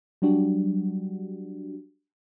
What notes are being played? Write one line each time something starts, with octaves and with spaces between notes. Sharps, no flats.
F#3 G3 D4 F#4 G4